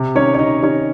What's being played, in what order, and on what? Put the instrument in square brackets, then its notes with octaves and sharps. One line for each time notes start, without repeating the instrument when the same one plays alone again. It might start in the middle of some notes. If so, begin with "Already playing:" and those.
Already playing: [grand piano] C3
D#3 C#4 C#5
C#5
C3 D#4 D#5
D#3 C#4 C#5